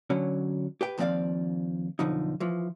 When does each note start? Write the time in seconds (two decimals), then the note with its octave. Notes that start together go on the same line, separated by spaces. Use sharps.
0.10 D3 F#3 C#4
0.81 G4 B4 G5
0.98 D#2 F3 C4 E4 D5 F5
1.99 B1 F2 D3 F3 D#4
2.40 E3 F3